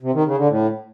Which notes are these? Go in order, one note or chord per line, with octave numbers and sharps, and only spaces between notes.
C3
D#3
C#3
D3
A2